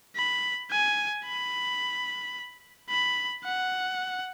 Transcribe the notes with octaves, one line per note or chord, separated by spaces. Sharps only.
B5
G#5
B5
B5
F#5